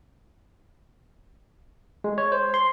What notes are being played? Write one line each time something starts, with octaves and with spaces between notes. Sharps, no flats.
G#3
C#5
C5
C6